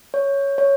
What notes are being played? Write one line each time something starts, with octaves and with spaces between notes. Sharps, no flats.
C#5
C#5